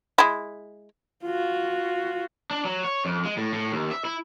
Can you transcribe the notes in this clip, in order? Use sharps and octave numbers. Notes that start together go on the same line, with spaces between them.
G#3 E4
F4 F#4
D4
F#3
C#5
F2
G#3
A2
A2
D#2
E5
E4